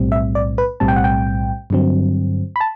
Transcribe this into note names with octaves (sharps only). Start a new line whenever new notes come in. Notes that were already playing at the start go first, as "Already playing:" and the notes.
Already playing: B1 A2 G3 C4
E5
D5
B4
B1 A2 G3 C4 A5
G5
F#5
G5
G2 D3 F#3 C4
B5
A5